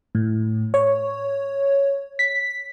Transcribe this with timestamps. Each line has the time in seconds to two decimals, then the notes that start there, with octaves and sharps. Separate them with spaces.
0.15 A2
0.74 C#5
2.19 B6